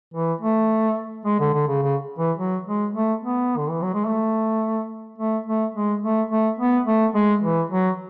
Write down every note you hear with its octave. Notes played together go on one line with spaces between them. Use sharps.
E3
A3
G#3
D3
D3
C#3
C#3
E3
F#3
G#3
A3
B3
D3
E3
F#3
G#3
A3
A3
A3
G#3
A3
A3
B3
A3
G#3
E3
F#3